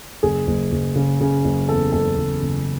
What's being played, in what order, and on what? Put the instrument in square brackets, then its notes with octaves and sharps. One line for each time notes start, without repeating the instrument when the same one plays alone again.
[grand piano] F#1 G#4
F#1
F#1
C#3
C#3
F#1
E2 A4
F#1 A4
F#1
F#1